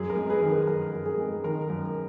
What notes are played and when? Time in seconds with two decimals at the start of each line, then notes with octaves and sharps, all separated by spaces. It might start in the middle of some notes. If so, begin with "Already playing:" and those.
Already playing: F#2 G#4
0.10 A#4
0.16 G#3
0.29 G#4 B4
0.42 D#3
0.49 A#4
0.67 F#2 A#4
0.94 F#2
1.06 G#4
1.18 G#3
1.44 D#3 A#4
1.70 F#2